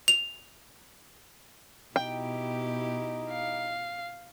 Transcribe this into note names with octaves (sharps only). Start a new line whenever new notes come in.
F7
B2 D#4 E4 G4 G5
F5